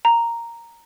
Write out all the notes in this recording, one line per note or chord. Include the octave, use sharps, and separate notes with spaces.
A#5